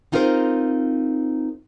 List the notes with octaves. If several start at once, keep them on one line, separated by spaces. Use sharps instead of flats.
C4 D#4 F4 G#4 A#4 C5